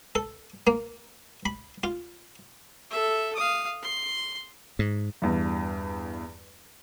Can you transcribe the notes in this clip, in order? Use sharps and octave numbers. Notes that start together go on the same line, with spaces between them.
A4
A#3
B5
F4
A4 E5
F5 D#6
C6
G#2
E2 G2